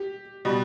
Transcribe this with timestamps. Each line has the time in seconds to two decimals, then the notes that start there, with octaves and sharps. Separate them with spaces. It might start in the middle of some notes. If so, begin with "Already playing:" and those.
Already playing: G4
0.45 B2 G3